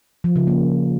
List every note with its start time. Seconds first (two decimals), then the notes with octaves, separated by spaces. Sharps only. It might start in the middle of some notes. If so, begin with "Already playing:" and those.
0.24 F3
0.36 C#3
0.47 A#3